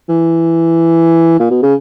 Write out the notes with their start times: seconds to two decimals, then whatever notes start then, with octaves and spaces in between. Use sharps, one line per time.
0.09 E3
1.39 A#2
1.50 B2
1.63 C#3